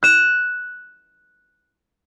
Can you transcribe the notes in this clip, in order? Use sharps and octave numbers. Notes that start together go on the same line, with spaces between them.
F#6 E7